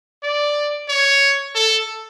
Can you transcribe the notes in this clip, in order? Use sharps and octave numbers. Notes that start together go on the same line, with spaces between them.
D5
C#5
A4